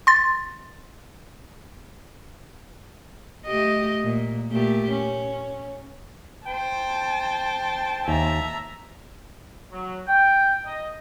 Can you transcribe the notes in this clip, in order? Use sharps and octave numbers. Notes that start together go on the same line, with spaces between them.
C6 A6
A3 G4 D#5
A#2
A#2 A3 G4
C#4
C5 G5 A5
D#2 E5 G#5 A#5
F#3
G5
D#5